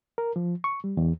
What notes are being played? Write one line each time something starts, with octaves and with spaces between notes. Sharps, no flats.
A#4
F3
C#6
G3
E2